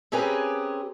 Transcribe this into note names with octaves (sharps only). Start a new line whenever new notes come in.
C4 C#4 G4 G#4 A#4 B4